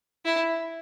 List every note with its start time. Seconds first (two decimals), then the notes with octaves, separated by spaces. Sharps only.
0.25 E4